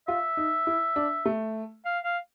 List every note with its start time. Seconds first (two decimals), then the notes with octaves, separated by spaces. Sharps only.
0.08 F4 E5
0.37 D#4
0.67 E4
0.96 D4
1.25 A3
1.85 F5
2.04 F5